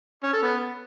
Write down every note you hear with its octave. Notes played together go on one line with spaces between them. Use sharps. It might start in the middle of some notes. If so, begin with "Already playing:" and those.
C#4
A4
B3